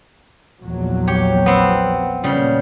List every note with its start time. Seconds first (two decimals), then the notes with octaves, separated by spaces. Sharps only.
0.64 A#1 E2 F#3
1.08 G4 C#5
1.46 B3 C4
2.24 A#2 C#3 F3 G3